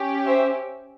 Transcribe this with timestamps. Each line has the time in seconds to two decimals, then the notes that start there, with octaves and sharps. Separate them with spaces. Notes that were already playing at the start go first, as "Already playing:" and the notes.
Already playing: C#4 G4
0.26 C5 E5